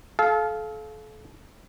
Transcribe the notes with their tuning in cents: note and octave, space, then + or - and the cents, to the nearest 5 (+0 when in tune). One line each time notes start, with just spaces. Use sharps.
A4 -35 F5 +0